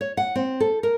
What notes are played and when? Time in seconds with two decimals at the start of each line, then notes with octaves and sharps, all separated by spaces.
0.01 C#5
0.17 F#5
0.36 C4
0.60 A4
0.83 A#4